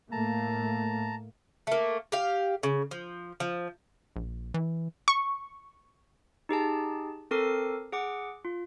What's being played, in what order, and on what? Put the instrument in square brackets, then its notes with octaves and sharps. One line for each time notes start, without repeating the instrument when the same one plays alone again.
[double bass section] A2 A3 A#3 [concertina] A5 A#5
[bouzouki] A3 A#3
G4 F5
C#3
F3
F3
[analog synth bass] A#1
E3
[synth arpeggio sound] C#6
[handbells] D#4 G4 G#4 A5
C4 A4 A#4 D6 C7
G#4 F#5 D6
F4